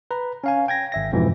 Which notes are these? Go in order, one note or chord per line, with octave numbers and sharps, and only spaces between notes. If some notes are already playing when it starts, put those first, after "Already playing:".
B4 A#5
C#4 F5 G#5
G5 G#6 A#6
G#1 E5 A#6
F2 G#2 B2 E3 F3